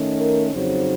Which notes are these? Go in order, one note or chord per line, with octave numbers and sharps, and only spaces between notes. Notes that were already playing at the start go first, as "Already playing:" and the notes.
Already playing: D#3 A3 C#4
A#4
F2 C#3 F#3 C4 D#4 C5